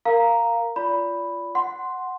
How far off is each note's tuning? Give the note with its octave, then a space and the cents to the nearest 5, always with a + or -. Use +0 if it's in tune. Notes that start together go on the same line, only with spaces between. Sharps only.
A#4 -10 F5 +0 A#5 +0
F4 -15 D5 -30 B5 +0
F#5 +0 C6 +0